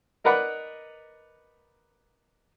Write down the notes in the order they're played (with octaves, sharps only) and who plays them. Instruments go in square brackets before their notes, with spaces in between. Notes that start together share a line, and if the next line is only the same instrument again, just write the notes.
[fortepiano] D#4 A#4 B4 D5 F#5 B5